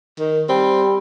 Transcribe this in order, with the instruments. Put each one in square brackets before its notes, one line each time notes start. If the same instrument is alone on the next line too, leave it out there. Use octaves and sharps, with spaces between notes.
[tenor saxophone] D#3
[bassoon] G3 [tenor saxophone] C4